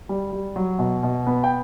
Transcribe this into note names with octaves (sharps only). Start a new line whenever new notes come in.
G3
G3
F#3
B2
B2
B3
G5